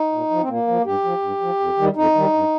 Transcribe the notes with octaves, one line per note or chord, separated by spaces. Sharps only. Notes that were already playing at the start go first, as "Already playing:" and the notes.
Already playing: D#4
A#2
F3
C4
A#2 A#3
F3
G2 G4
F3
G2
F3
F2
D#3 G3
F2 D#4
D#3 G3
G2